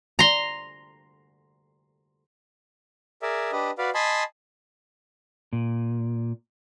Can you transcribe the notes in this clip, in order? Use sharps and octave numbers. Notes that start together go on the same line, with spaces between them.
A#5 C6
G#4 A#4 D5 E5
D4 G4 B4 D#5
F#4 B4 D5 F5
D#5 G#5 A5 B5 C6
A#2